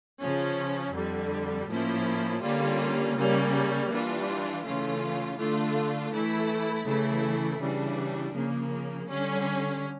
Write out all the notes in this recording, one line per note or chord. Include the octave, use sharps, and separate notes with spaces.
C#3 F3 C#4
F2 D3 G3
A2 F3 A#3 C#4 E4
D3 G3 A#3 C#4 F4
C#3 G3 A#3 C#4
E3 G3 D4 F4
C#3 E3 A3 C#4 F4
D3 A3 D4 F4
E3 A3 E4
C#3 E3 A3 E4
C#3 E3 G3 D4
C#3 F3 A#3
D3 G3 C#4